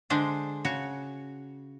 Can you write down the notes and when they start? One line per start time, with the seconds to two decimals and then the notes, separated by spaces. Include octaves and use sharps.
0.10 D3 G#3 D4 C5 D5
0.65 C#3 F#4 C#5